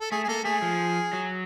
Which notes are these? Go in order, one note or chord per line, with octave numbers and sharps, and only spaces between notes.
A4
A3 G#4
G#4
A#3 A4
A3 G#4
F3
F#3